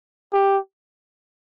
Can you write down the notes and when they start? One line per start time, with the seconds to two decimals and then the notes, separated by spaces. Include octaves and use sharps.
0.33 G4